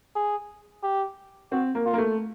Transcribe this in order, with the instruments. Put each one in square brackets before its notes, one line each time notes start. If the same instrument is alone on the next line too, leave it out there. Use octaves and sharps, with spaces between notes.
[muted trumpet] G#4
G4
[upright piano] C4 [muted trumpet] F#4
[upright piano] A#3
[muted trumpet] F4
[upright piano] A#3
A3